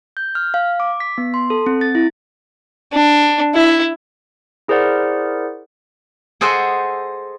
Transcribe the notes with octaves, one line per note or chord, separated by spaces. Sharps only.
G6
F6
F5
D6
B6
B3
C6
A4
C4
A6
E4
D4
E4
E4 G#4 A#4 C5 D5 F#5
G#4 A4 C5 D#5 F#5 G5